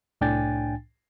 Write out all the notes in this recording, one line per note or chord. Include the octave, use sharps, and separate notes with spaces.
C2 A2 D4 G5 G#5 A6